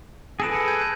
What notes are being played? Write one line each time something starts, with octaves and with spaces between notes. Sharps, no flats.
G#4 A4 B4 A#6 D7 E7
C#7
G6 G#6 D#7
G6